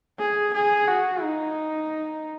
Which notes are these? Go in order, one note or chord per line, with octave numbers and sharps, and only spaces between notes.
G#4
G#4
F#4
D#4